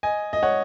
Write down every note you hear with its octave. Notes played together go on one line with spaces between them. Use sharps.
D#5 G#5
D#5
C#5 F#5